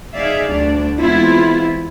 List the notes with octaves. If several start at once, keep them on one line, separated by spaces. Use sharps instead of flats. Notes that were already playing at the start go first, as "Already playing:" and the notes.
D#4 G#4 D5 E5 F5
D2 G3 D4 D5
E3 G#3 B3 C4 E4 F4